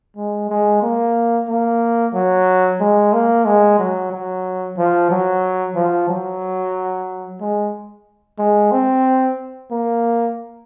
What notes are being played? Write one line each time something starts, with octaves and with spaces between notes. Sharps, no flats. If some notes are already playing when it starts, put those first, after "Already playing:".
G#3
G#3
A#3
A#3
F#3
G#3
A#3
G#3
F#3
F#3
F3
F#3
F3
F#3
G#3
G#3
C4
A#3